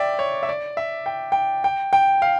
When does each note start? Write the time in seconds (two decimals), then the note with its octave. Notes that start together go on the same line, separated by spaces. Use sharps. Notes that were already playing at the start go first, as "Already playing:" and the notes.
Already playing: D5 E5 G5
0.19 C#5
0.43 E5
0.49 D5
0.77 E5
1.06 G5
1.32 G5
1.64 G5
1.93 G5
2.22 F5